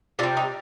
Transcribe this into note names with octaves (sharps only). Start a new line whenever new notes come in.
C3 G3 D4 F4
D#4 G4